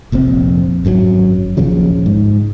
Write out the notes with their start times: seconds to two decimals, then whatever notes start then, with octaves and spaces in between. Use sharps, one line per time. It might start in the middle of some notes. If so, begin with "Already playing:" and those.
0.12 F1 A#1 F2 C4
0.85 G#1 F#2 C#3 F#3
1.57 A#1 D#2 C#3 F3
2.06 G#2